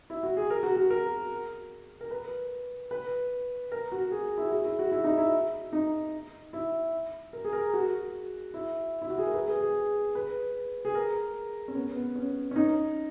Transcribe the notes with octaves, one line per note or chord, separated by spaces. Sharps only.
E4
F#4
G#4
A#4
F#4
F#4
A#4
A#4
B4
B4
A#4
F#4
G#4
E4
F#4
G#4
E4
F#4
E4
D#4
E4
D#4
E4
A#4
G#4
A#4
F#4
E4
E4
F#4
G#4
A#4
B4
G#4
G#4
B4
G#4
A#4
C#4
B3
B3
C#4
C#4
D#4